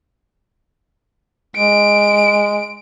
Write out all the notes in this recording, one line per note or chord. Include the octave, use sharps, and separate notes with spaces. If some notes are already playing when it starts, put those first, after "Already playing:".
G#3 D7